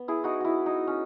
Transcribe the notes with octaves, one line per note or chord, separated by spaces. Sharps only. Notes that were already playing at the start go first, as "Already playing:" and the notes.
Already playing: B3
E4 G#4
D#4 F#4
E4 F#4
D#4
C#4